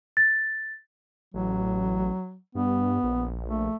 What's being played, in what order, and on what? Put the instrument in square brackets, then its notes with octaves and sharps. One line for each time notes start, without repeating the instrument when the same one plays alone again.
[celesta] A6
[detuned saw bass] A1 [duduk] F#3
[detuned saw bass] G2 [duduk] B3
[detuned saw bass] A#1
[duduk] A3